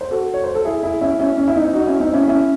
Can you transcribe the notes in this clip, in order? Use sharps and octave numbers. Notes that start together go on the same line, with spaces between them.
C5
F#4 A4
C#5
C5
A4
E4 G#4
E4 G#4
C#4 E4
C#4 E4
C#4
E4
C4 D#4
D#4 F#4
C#4 E4
C4 D#4
C#4 E4
C#4 E4